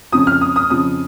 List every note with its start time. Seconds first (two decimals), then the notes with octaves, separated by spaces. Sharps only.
0.12 F2 C#3 F3 D#6
0.27 F6
0.41 D#6
0.56 D#6
0.70 F2 C#3 F3 D#6